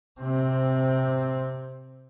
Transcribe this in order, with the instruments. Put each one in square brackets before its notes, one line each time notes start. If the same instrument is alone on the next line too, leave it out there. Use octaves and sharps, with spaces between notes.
[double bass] C3 C4